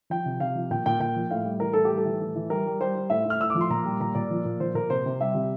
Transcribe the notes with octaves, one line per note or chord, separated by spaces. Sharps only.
F3 G5
C3
C3 F5
F3
A#2 G5
A#2 G5
A#2 G5
F3
A2 F5
G3
E3 A#4
A2 A4
G4
G3
A4
E3
A2
E3
G3 A#4
G3
G3 C5
G3
A2 E5
A2
F6
A2 E6
F3 D6
C6
A#2 A#5
G3
A#2 A#5
A#2 D5
F3
A#2
F3 C5
A#2 A#4
C3 C5
C3
G3 E5
C3